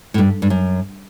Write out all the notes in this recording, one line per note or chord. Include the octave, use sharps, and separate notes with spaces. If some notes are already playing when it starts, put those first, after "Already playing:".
A2
G2
G2
F#2